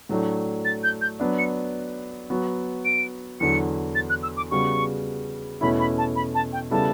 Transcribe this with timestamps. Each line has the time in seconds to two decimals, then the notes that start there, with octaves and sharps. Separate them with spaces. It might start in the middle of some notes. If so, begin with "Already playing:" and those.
0.09 A2 F#3 A3 D4
0.65 A6
0.84 G6
1.01 G6
1.20 F#3 B3 D4
1.39 C#7
2.30 F#3 B3 F#4
2.85 D7
3.40 E2 D3 F#3 C#7
3.95 A6
4.09 F#6
4.23 E6
4.37 D6
4.51 C#3 G3 B3 F#4 C#6
5.61 E2 B2 A3 C#4 E4 B5
5.79 B5
5.98 A5
6.16 B5
6.35 A5
6.53 G5
6.71 C#3 G3 B3 E4 A4 A5